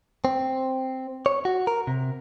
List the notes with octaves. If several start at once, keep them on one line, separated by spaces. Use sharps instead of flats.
C4
C#5
F#4
A#4
C3